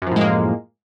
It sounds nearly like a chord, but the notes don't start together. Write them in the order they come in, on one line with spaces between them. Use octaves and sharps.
F#2 F3 A2 G#3 A#3